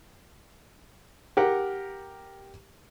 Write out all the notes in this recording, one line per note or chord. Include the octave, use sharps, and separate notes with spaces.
G4 A#4 F#5